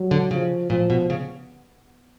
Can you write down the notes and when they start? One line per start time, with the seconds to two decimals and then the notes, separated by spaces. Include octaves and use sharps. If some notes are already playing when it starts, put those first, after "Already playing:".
Already playing: F#3
0.11 D3
0.31 C#3 F3
0.70 A#2 F3
0.90 B2
1.10 C#3